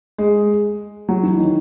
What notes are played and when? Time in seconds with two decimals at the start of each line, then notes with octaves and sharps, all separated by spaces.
0.18 G#3
1.09 F#3
1.23 E3
1.38 D#3